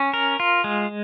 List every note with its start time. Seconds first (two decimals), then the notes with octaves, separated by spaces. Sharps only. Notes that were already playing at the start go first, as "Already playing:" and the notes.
Already playing: C#4
0.14 A#4
0.40 F4
0.64 G#3